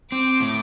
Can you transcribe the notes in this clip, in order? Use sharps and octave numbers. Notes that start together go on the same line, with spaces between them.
C4 D6
A2